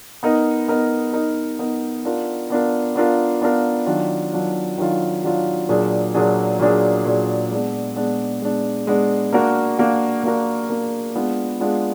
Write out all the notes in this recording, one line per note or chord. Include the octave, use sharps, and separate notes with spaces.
B3 D#4 A#4 D#5
B3 D#4 A#4 D#5
B3 D#4 A#4 D#5
B3 D#4 A#4 D#5
B3 D4 F4 A#4
B3 D4 F4 A#4
B3 D4 F4 A#4
B3 D4 F4 A#4
D#3 F#3 D4 F4
D#3 F#3 D4 F4
D#3 F#3 D4 F4
D#3 F#3 D4 F4
A#2 F#3 D4 G#4
A#2 F#3 D4 G#4
A#2 F#3 D4 G#4
A#2 F#3 D4 G#4
G#3 B3 D4
G#3 B3 D4
G#3 B3 D4
G#3 B3 D4
A#3 D4 F#4 A#4
A#3 D4 F#4 A#4
A#3 D4 F#4 A#4
A#3 D4 F#4 A#4
G#3 B3 D4 F4
G#3 B3 D4 F4